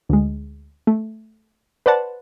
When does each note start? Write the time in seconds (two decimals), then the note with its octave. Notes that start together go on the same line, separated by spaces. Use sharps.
0.09 D2 G#3
0.87 A3
1.86 B4 C5 D5 F#5 A5